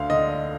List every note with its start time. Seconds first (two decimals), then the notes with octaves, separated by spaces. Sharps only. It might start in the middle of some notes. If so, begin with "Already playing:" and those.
Already playing: D2 F5
0.10 D3 D#5